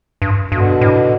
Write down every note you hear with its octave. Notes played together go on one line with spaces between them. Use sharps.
G2
G2 B2 D3
A2